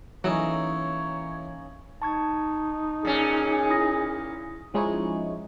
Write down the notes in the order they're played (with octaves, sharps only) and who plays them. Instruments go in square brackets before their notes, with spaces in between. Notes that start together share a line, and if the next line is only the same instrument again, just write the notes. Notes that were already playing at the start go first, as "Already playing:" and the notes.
[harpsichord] E3 G#4 A4 [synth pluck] F#3 [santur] A#3 C#4 D#4 [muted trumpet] C#5
[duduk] D#4 [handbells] A5 C#6 G#6
[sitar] A#2 C#4 [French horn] G#4
[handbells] E4 D#6 A#6
[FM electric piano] F3 G#3 C#4 D#4 E4 C#5